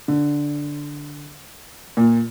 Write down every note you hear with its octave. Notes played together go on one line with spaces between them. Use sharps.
D3
A#2